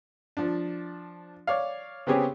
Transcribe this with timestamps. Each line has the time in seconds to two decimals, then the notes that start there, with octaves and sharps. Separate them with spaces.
0.37 F3 D4
1.47 C#5 D5 F5
2.07 C#3 B3 C4 G4 G#4 C#5